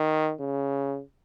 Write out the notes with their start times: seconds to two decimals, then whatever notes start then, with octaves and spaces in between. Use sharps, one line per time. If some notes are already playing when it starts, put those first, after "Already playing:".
Already playing: D#3
0.40 C#3